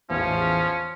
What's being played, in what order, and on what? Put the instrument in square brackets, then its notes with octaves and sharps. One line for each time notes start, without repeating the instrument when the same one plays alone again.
[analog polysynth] A1 E2 [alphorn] F3 [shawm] C#4